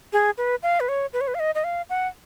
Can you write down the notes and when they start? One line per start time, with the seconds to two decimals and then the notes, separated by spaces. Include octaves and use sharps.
0.13 G#4
0.38 B4
0.63 F5
0.80 B4
0.89 C#5
1.13 B4
1.21 C#5
1.28 B4
1.35 F5
1.40 D#5
1.55 D#5
1.64 F5
1.90 F#5